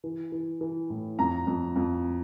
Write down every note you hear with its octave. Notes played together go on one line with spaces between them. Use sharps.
E3
E3
E3
A2
F2 A#5
F2
F2